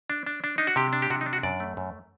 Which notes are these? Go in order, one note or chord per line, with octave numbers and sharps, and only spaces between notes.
D4
D4
D4
D4 D#4
F#4
C3 G4
D4
G4
C3 F#4
D#4
D4
F#4
F#2 D5
A3
F#2